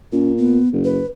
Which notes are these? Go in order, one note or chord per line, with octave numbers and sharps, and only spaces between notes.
A#2 C#4
B3
F#1
B4